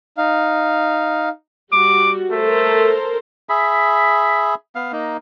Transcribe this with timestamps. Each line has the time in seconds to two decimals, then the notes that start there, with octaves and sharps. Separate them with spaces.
0.18 D#4 F5
1.72 G3 F#4 D6
2.31 A3 A4 A#4 C5
3.49 G#4 E5 B5
4.75 B3 F5
4.92 A#3 D#4